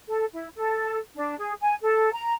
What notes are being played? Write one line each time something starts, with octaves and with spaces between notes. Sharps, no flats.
A4
E4
A4
D4
G#4
G#5
A4
A#5